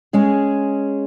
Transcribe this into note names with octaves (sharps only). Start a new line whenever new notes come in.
G#3 C#4 G#4